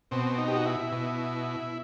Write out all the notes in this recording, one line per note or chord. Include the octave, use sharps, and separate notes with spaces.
B2 C4
D#4
G4
F#4
E4
B2